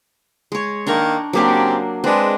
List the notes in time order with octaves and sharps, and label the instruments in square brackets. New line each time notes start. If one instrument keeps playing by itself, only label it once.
[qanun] G#3 C#5
[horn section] D#3 A#3 [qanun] D4 A#5 C#6
[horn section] C#3 C4 G4 [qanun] F#3 A#3 D4
[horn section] G#3 D4 [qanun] C4 B4